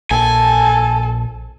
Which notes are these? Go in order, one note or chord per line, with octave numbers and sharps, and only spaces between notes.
A#1 A4 G#5